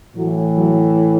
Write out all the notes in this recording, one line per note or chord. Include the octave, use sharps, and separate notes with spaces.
A2 E3 F#3
F#3